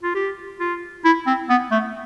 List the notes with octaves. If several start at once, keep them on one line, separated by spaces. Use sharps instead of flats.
F4
G4
F4
E4
C4
B3
A3